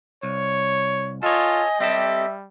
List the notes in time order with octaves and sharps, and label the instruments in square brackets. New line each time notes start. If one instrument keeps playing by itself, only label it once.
[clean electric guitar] C2 [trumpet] C#5
[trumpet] F4 [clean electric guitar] A4 C#5 [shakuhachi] D#5 [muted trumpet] G#5
[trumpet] G3 [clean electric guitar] C4 G4 A4 [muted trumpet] E5